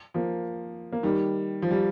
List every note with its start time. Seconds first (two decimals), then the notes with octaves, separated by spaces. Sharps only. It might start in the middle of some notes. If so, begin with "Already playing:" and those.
0.14 F3 A#3
0.92 A#3
1.03 D#3 G3
1.62 F3
1.71 G3